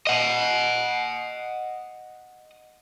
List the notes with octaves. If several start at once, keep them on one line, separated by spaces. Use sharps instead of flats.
D#5 F#5